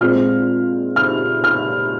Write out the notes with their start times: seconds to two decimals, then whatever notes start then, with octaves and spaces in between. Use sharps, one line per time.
0.01 A#2 G#3 C4 F6
0.96 F6
1.44 F6